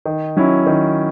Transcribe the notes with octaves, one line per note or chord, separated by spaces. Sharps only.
D#3
F#3 C#4 E4
D#3